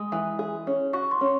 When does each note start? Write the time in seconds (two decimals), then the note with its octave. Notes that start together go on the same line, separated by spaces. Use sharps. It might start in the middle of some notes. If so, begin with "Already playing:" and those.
Already playing: G#3 D#6
0.12 E3
0.39 G#4
0.67 C#4
0.93 F#4 C#6
1.11 C6
1.21 C#4